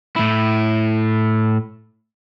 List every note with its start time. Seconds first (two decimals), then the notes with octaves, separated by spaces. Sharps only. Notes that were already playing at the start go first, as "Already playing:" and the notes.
0.16 A2 E4